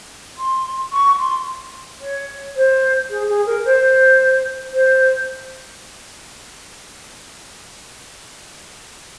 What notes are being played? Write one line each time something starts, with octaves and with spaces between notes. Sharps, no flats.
C6
C#6
C6
C#5
C5
G#4
G#4
A#4
C5
C5